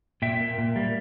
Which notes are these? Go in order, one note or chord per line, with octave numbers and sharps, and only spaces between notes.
A#2 E5 G5
A#3
A#2
G3 A#3